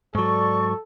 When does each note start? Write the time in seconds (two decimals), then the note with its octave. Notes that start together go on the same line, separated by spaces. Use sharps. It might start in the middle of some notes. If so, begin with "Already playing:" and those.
0.15 G#2 F#3 A4 D5 C#6